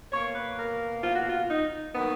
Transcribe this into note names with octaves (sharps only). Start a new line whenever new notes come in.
B2 A#3 C#5
B4
A#4
F4
F#4
F4
D#4
D#3 F#3 A#3 B3